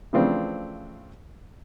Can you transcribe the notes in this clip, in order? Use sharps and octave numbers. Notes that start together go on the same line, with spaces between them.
C#3 E3 F3 A3 C4 D4